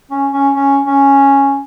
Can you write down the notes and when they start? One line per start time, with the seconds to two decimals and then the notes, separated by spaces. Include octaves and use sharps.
0.11 C#4
0.33 C#4
0.54 C#4
0.86 C#4